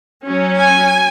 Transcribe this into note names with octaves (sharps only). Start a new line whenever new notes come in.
F#3 C#4
G#5